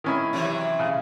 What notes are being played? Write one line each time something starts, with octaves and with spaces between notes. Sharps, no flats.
D#3 C#4 E4
C3 E3 F#3
C#3